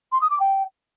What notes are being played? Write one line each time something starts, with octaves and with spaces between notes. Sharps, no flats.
C6
D#6
D6
G5